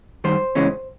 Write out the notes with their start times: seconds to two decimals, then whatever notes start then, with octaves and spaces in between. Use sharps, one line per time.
0.24 F#2 D#3 G3 C5
0.55 E2 C#3 E3 G#3 C#4